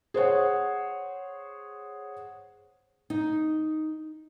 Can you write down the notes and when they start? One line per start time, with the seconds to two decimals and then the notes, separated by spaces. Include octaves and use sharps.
0.14 G#4 C5 C#5 F#5
3.10 D#4